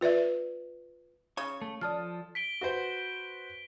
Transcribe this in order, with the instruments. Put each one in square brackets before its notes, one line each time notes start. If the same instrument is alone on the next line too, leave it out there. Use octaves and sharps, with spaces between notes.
[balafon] F4 B4 D5 E5
[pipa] C#3 [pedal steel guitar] C#6
[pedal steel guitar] A3
[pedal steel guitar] F3 A4 D#6 [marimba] D5 A5 F6
[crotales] B6 D7 G7
[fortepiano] F#4 B4 C5